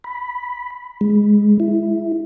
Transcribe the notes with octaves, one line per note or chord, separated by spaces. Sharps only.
B5
G#3
E4